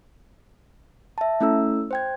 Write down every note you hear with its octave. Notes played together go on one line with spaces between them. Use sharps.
E5 A5
A3 C#4 E4 A4 E6
C5 G5 G#6